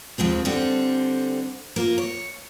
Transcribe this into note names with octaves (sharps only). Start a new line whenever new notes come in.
D#2 F3 G#3 C4
D3 G3 C4 A4
A#3 F4 A#4
C#5